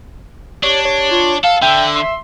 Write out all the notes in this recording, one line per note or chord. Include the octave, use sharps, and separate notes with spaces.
D4 G4 C#5
C#5
F4
A4 F5
D3 E5 G5
C6